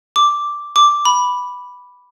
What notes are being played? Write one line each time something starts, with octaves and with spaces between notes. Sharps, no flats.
D6
D6
B5